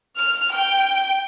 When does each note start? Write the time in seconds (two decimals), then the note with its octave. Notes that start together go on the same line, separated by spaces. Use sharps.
0.17 F6
0.54 G5